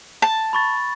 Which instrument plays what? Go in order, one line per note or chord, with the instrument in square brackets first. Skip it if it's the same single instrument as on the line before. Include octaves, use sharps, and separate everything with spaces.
[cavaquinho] A5
[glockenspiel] B5 C#6 A6